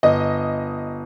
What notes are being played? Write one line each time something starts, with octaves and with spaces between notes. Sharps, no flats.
G1 D#5